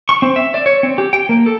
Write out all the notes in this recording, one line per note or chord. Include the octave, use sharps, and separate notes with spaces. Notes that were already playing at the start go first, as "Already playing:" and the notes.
C#6
C4
E5
D5
C#5
C4
G4
G5
A#3
A4